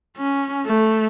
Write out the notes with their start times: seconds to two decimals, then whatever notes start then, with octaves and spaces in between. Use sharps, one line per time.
0.17 C#4
0.66 A3